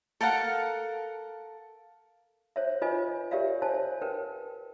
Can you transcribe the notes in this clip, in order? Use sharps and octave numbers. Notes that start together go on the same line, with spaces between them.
A4 A#4 F5 F#5
C5 C#5 E5
F4 B4 C#5 D#5 G#5
G4 A#4 C#5 D5 E5 F5
C5 C#5 G#5 A5
A#4 B4 G5